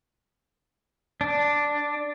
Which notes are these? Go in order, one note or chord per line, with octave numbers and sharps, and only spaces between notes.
D4